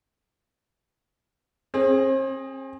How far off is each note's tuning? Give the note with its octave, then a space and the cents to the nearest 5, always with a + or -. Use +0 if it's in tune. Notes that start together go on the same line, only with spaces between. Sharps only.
C4 +40 G#4 +0